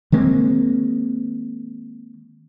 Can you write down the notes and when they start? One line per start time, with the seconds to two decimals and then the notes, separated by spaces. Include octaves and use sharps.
0.12 D#3 G#3 A#3 C4